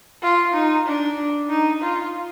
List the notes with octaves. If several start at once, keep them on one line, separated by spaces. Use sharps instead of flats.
F4
D#4
D4
D#4
F4